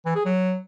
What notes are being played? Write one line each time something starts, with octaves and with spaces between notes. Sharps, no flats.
E3
G#4
F#3